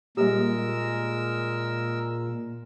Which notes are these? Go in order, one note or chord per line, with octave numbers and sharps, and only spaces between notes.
A#2 G3 G#3 A#3 G4 A#4 E6